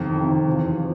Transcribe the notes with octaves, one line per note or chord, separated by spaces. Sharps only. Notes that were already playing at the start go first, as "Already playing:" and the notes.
Already playing: F2 C3 D#3
F2 C3 D#3
E2 C3 F3
F3